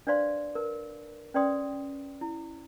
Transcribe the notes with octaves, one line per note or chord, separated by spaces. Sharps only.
D4 B4 C5 D5 F5 C6
A#4 B4
C#4 B4 D5 G5 C6 D#6
E4